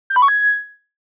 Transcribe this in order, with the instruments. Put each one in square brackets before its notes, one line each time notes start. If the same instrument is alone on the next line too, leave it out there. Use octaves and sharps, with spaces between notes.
[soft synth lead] G6
B5
C#6
G#6